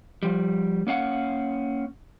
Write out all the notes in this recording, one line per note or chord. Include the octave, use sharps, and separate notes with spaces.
F3 G3
A#3 C#4 F5 F#5